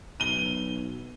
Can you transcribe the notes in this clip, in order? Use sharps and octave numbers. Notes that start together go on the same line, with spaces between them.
B1 D#7 G7